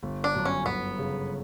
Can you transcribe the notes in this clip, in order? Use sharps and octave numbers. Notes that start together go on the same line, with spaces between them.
G1
D4
F#2
C#4
G1 B3
C#3